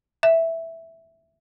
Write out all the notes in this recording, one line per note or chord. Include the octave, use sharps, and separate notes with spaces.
E5